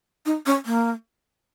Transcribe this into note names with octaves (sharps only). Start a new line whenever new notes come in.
D#4
C#4
A#3